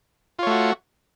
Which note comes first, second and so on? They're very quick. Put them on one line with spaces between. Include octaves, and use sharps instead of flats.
F4 C#5 A3 F#4